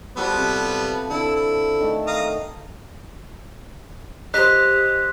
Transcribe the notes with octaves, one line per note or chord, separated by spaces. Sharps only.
F3 G3 B3 F#4 A4 B4
C3
D3 E4
E4
D#3 A3
F5 A#5 D#6
G4 C5 D#5 F#6 B6